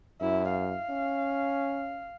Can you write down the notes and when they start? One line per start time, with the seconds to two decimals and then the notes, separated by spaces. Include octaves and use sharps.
0.21 F#2 E4
0.51 F5
0.90 C#4